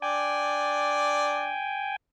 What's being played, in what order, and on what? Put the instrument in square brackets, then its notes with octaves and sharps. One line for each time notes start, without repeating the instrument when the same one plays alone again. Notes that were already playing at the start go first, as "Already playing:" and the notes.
[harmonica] D4 D5 [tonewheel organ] G5 G#5